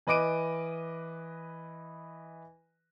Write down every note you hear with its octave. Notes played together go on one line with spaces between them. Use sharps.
E3 B4 D#5 D6 D7 D#7